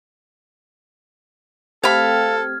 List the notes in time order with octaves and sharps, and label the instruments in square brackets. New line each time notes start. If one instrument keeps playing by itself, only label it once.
[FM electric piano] A3 C4 G4 [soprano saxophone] A4 [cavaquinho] F5 B5 [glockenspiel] F6 G#6